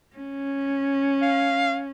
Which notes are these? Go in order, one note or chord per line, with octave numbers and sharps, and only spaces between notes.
C#4
F5